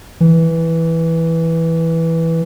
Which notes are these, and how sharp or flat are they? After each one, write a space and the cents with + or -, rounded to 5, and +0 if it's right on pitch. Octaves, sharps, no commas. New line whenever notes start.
E3 -5